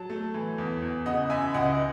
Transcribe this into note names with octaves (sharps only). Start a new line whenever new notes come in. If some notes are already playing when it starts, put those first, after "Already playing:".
Already playing: F#3 A5
A3
E3
E2
E2
C#3 D#5 F#5
F#2 E5 G#5
C#2 D#5 F#5